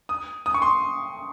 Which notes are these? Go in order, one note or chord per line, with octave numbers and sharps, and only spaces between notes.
D#6
D#6
C#6
C6